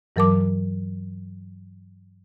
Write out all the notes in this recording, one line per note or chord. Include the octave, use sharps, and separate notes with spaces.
G2 E3 F#3 A#4 A5 D6